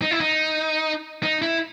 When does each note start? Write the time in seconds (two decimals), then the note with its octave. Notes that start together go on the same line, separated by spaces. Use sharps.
0.02 D#4
0.11 E4
0.20 D#4
1.23 D#4
1.42 E4